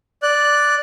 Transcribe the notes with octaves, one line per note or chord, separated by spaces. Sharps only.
D5 F#6